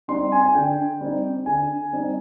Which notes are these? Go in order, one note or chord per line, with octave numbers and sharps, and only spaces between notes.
G3 C4 D#4 C6
G#5
G#5
D3 G5
G3 C4 D#4
D3 G#5
G3 C4 D#4